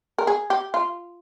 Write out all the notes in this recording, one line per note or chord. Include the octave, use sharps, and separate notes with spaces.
A#4
G#4
G4
F4